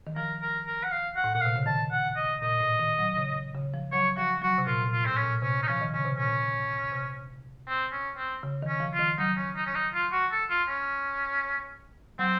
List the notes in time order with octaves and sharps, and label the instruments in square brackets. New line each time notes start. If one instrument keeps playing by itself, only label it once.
[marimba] D#3
[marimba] F3 [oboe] A#4
[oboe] A#4
A#4
F#5
F5
F#5
[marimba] A2
[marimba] A#2 [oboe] F#5
[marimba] C3 [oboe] F5
[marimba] C#3
[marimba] D#3 [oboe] A5
[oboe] F#5
D#5
[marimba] A#2 [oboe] D#5
[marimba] A2
D#3
F#3
C#3
C#3
F3
[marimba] F#3 [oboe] C#5
[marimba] F3 [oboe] F#4
[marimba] F#3 [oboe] F#4
[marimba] C3
[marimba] A#2 [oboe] F4
[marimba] A#2
[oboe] F4
[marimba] A2 [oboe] C4
[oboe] C#4
[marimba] A#2
[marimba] C3 [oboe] C#4
[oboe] D#4
[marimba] F3 [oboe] C#4
[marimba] D#3
[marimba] C#3 [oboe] C#4
[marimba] C3
[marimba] A#2 [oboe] C#4
[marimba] C3
[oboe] C4
C#4
C4
[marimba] C#3
D#3
[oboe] C#4
[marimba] F3
[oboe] F4
[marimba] D#3
[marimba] F#3 [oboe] D#4
[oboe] C#4
D#4
C#4
D#4
F4
F#4
A4
F4
C#4
[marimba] F#3 [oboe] C4